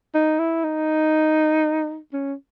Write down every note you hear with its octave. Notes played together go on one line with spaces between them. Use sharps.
D#4
E4
D#4
C#4